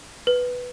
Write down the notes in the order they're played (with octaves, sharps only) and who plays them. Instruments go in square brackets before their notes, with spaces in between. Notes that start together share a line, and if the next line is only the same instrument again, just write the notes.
[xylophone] B4